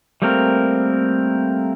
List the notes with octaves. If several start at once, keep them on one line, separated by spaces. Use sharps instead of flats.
G3 A3 A#3 C4 A#4